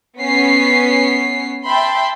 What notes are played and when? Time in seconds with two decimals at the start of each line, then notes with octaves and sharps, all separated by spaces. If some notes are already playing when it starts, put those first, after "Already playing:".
0.19 B3 C#4 B6 C7
1.66 E5 G5 A5 B5 C6